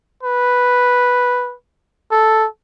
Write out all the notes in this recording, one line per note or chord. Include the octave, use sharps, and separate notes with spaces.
B4
A4